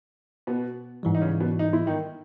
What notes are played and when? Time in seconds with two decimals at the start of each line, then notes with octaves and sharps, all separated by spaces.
0.47 B2 B3
1.03 G#2 E3 G3
1.15 D#4
1.21 C#3 C#4
1.40 B2 B3
1.59 D#4
1.73 E4
1.87 D#3 D#4